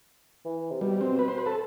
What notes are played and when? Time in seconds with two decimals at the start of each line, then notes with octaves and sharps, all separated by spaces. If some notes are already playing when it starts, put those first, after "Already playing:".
0.45 E3
0.71 C3
0.81 B2 G3
1.01 C4
1.19 B4
1.28 C5
1.38 B4
1.46 A4